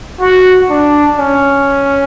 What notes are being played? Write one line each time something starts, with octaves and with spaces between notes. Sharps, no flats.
F#4
D4
C#4